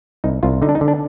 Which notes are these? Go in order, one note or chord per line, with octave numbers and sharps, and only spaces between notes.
C2 D#4
C2 F4
D3 D#4
D4
D#4
D3
D4